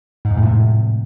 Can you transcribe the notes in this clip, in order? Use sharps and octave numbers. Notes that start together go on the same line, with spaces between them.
G#2
F2
A2
C3
A2